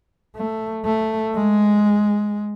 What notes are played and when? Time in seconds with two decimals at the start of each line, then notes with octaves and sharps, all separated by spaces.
0.36 A3
0.85 A3
1.35 G#3